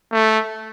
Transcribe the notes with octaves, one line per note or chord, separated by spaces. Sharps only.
A3